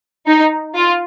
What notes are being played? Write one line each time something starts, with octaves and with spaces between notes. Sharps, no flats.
D#4
F4